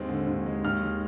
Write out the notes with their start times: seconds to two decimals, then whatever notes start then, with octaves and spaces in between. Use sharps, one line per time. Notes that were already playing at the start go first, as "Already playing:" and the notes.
Already playing: D#2 G#3 C4
0.09 D3
0.27 D#2
0.46 G#3
0.65 D#2 F6
0.83 G#3